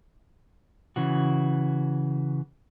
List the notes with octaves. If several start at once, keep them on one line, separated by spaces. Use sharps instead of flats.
C#3 E3 F#4